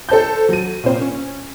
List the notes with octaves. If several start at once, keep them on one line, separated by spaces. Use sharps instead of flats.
A4 C5 A5 G6
F#3 D#7
A#2 C4 C5
C#4